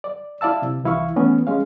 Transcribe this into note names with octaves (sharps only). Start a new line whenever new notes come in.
D5
E4 D5 F5 A5 E6
C3
C2 E3 E4 F5 C#6
E3 A3 B3 C#4
G#3 C#4 F5